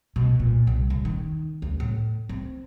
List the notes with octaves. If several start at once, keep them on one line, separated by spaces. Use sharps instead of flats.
B2
A#2
C2
D#1
D#3
D2
A2
C4